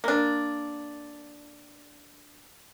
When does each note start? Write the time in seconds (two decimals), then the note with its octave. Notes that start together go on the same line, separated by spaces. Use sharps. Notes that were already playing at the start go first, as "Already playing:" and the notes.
0.04 A#3 D4